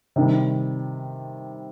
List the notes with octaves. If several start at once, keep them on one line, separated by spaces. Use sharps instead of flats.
C3 D#3 G3